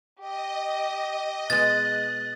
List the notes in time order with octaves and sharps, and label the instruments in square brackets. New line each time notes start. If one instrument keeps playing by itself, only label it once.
[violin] G4 [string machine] D#5
[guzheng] B2 G#3 [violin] F#6 [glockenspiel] A6